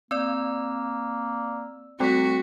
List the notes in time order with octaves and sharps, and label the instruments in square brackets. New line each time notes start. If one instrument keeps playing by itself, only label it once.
[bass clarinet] A#3 [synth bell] C4 D5 [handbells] E6
[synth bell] G3 A3 A4 [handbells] C4 B6 [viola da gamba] F#4